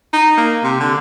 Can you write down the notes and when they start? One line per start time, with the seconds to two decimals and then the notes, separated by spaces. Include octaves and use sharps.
0.13 D#4
0.37 A#3
0.63 C3
0.80 D3